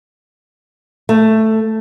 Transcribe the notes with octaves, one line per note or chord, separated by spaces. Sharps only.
A3